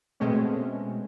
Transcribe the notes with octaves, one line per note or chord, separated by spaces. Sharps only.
B2 G#3 A3 C4 C#4